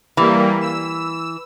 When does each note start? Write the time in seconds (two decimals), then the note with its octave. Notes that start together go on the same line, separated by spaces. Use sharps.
0.17 E3 G3 A#3
0.61 E6